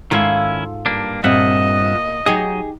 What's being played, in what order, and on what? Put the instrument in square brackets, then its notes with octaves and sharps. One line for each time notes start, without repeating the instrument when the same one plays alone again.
[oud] G#2 F4 A4 [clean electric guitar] D#3 C#4 E4
[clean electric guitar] G2 A#3 D4
[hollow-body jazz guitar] G2 C4 [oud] A#2 [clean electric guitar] F4 E5 F#5 [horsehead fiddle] D#5
[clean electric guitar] F#3 D#5 [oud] D#4 G4 [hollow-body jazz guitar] G#4